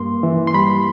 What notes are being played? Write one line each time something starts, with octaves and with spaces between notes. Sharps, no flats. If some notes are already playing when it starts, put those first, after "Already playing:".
Already playing: G2 A#3 C6
E3
C6
G3 B5